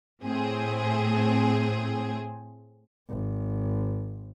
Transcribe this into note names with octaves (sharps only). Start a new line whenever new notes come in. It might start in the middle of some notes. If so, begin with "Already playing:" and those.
A2 C4 G#4
G#1